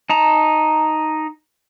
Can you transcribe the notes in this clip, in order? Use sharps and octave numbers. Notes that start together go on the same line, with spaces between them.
D#4 A5 A#5